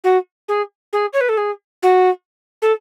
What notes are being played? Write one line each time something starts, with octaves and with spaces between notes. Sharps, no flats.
F#4
G#4
G#4
C#5
B4
A4
G#4
F#4
A4